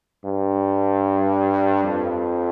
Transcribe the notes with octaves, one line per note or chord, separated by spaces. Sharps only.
G2
F2